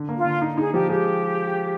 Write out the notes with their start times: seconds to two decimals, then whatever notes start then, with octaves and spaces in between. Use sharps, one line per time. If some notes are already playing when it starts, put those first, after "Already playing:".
Already playing: D3
0.09 A#3
0.17 F4
0.25 D3
0.42 D#4
0.57 D#4 G#4
0.73 F3 G4
0.90 G#3 G4